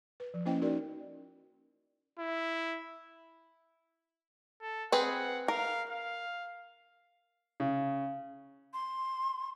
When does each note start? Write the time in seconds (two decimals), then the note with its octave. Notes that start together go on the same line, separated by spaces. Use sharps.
0.20 B4
0.34 F3
0.45 A#3 C#4 E4 C5 D#5 G5
0.62 C#4 D#4 F#4 A#4 D5
2.19 E4
4.61 A4
4.92 C4 G#4 B4 F#5
5.48 A#4 F5
5.90 F5
7.60 C#3
8.73 C6